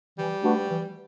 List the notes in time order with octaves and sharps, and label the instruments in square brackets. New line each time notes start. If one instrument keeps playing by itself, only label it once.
[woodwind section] E3 [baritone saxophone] G3
[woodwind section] A3 D4 F#4 B4
E3